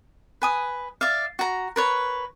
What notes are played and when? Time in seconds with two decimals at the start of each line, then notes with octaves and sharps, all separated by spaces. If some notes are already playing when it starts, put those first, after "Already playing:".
0.42 B4 G#5 D#6
1.01 D5 E5 F5
1.39 F#4 A#5
1.76 A#4 B4 C#5